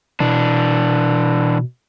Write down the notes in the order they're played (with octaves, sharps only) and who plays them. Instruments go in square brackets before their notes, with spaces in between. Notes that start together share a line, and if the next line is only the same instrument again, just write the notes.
[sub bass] B2 [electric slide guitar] E3 D4